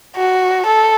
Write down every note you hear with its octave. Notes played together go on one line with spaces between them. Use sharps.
F#4
A4